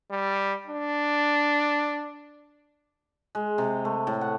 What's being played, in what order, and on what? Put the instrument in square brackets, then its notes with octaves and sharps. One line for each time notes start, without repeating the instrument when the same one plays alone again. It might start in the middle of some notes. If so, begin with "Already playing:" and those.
[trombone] G3
D4
[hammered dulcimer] G#3
C3
A3
A2
F#5